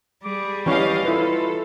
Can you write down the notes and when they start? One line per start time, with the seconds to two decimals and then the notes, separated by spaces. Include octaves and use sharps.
0.24 G3 G#4 D6
0.66 E3 C#4 G4 D#5 F5 C#6
1.05 E4 F4 A4 B4